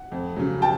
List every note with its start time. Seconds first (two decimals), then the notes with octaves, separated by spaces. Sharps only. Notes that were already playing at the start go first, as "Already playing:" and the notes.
Already playing: F#5
0.12 F2
0.36 C#3 F#3
0.62 G5 A5